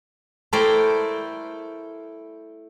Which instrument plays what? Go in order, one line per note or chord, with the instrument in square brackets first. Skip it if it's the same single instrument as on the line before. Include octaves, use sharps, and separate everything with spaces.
[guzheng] A3 E4 A#4 C5 D5 G5